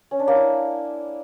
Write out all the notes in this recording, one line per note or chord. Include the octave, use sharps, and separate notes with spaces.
C#4
D4
A#3
E4